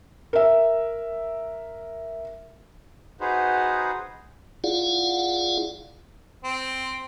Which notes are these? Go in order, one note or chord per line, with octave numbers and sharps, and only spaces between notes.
A#4 E5
D#4 F#4 G#4 B4 C5
E4 F4 G#4 D5 F5 F#5
C4